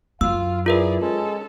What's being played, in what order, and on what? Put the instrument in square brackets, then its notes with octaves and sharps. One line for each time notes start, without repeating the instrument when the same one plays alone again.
[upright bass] F#2 [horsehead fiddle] F4 [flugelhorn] F5 [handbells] E6
[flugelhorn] E4 [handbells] F4 A#4 B4 [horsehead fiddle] G#4 D5
[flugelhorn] G#3 [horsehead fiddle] C#4 A4